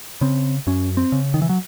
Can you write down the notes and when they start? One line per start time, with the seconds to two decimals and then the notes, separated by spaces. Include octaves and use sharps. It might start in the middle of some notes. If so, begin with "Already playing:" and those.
0.21 C#3 C4
0.67 F#2 C#4
0.97 C4
1.12 C#3
1.34 D#3
1.42 E3
1.49 F#3